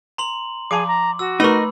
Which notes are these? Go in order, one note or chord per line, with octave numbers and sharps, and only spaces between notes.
A#5 C6 F#7
F3 G#4 F5 A5 D6
A#5
F#4 E6
A3 D#4 A#4 B4 B5 C#6 E6